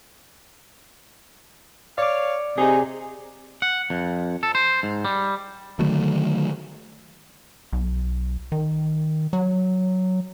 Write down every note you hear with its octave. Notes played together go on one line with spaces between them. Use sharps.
C#5 D5 F5 D6
C3 D#4 G#4
F#5
F2
A4
C5
G#2
G3
D3 D#3 F#3 A3
B1
D#3
F#3